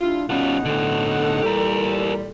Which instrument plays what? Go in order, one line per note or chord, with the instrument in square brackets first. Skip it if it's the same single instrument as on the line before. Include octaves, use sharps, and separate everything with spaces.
[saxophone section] G3 E4 F4 [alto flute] D4
[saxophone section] B2 D#4 F#5 [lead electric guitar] G3 F4 [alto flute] C#4
[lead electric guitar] A2 D3 [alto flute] A4
[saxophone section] A#2 E3 G3 [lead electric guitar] G4 A#4